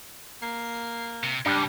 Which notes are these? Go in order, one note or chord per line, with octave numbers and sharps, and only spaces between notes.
A#3 C7
C3
G#2 C#3 G3 D4